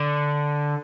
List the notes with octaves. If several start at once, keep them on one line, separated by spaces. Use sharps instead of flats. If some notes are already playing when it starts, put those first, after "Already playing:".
Already playing: D3